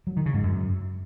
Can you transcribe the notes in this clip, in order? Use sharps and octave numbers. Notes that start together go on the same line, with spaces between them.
F#3
D#3
C#3
G#2
F#2